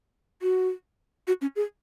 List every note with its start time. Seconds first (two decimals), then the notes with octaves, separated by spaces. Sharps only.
0.42 F#4
1.27 F#4
1.41 C#4
1.56 G#4